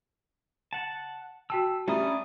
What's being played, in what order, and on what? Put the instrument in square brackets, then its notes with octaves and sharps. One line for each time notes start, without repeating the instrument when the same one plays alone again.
[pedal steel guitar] F#5 A5
[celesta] F#4 G5 A5 [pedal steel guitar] E6
[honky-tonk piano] G3 [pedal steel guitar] C#4 D4 D#6 [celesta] E5 A#5